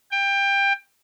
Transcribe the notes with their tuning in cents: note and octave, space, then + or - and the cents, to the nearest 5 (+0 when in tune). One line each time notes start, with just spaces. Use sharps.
G5 +20